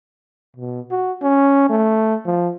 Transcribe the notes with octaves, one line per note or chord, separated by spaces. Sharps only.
B2
F#4
C#4
A3
F3